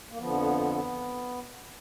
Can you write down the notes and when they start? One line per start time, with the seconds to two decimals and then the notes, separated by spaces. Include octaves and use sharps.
0.10 A#3
0.18 F2 D3 F3 B3